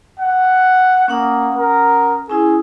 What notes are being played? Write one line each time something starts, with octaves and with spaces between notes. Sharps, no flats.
F#5
A#3 C#4 F#5 D#6
A#4
C#4 E4 G#4